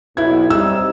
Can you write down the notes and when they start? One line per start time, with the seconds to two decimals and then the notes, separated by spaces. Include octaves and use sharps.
0.17 B1 E4 G#6
0.50 G3 C4 D#4 E6